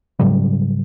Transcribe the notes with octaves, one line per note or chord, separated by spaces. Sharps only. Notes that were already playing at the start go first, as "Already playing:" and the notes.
G#2 C#3 F#3 G3